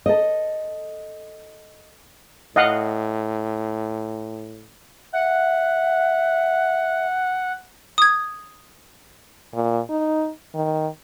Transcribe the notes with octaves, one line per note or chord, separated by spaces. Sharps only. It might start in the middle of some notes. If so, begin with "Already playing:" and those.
A4 D#5
A2 D#5 F5 F#5
E5 F#5
D#6 G#6
A#2
D#4
D#3